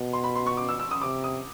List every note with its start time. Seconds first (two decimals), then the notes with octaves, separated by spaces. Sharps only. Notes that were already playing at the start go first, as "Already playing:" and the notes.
Already playing: B2
0.13 C6
0.24 B5
0.35 C6
0.46 C#6
0.57 D6
0.69 E6
0.80 E6
0.91 D#6
1.02 C3 D6
1.24 D#6